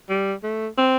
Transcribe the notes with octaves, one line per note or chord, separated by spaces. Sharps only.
G3
A3
C4